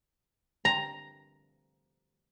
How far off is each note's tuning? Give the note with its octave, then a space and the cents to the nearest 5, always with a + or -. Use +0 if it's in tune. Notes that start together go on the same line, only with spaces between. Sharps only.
A#5 +5